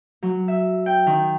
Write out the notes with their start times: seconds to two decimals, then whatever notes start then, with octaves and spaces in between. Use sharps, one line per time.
0.23 F#3
0.48 E5
0.86 G5
1.07 D#3